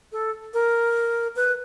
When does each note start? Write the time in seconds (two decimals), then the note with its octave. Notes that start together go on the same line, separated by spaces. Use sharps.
0.12 A4
0.54 A#4
1.36 B4